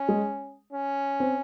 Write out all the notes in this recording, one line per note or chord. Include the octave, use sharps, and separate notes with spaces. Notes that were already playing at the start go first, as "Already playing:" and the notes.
Already playing: C#4
G#3
C#4
C4